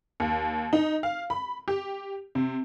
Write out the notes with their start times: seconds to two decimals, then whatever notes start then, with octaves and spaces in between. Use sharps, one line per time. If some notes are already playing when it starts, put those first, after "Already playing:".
0.20 D#2
0.73 D#4
1.03 F5
1.30 B5
1.68 G4
2.35 C3